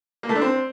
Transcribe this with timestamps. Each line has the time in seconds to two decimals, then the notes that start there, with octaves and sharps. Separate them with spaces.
0.23 A#3
0.29 A3
0.35 D4
0.41 C4